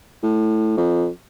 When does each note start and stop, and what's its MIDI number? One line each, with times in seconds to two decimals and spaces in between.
0.23 0.77 45
0.77 1.08 41